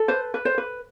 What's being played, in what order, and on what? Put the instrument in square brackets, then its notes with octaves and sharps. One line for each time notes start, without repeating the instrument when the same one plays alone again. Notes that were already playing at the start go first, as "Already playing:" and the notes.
Already playing: [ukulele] A4
B4 C5
B4
C5
B4